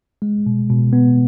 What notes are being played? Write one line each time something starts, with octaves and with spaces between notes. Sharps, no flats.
G#3
B2
B2
B3